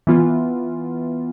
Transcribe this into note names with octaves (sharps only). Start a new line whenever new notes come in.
E3 B3 F4